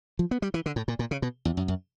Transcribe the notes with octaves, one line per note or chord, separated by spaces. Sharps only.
F3
B3
G3
E3
D3
A2
A#2
A#2
C#3
B2
E2
F#2
F#2